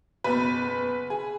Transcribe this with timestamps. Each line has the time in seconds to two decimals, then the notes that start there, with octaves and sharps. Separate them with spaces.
0.24 F#1 E2 B2 B4
1.10 G#4